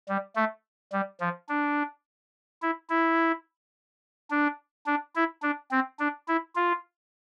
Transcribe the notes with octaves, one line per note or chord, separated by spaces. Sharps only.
G3
A3
G3
F3
D4
E4
E4
D4
D4
E4
D4
C4
D4
E4
F4